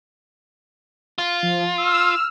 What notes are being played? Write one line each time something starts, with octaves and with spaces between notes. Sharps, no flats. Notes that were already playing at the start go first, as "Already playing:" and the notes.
F4
F3
E6 F6